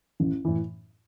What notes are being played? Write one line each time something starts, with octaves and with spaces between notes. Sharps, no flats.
A1
A2 E3